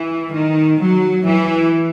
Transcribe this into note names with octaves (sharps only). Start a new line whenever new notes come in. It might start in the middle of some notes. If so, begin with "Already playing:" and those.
Already playing: E3
D#3
F#3
E3